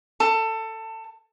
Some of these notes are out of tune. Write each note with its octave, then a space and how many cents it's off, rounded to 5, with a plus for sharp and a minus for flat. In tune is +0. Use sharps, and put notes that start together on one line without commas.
A4 +20